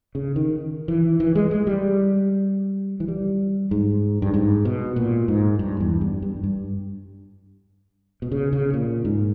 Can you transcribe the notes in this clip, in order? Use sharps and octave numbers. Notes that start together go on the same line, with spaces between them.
C#3
D#3
E3
E3
G#3
G#3
G3
E3
G3
G#2
G2
G#2
B2
A#2
G#2
G2
E2
G2
G2
G2
B2
C#3
C#3
A#2
G#2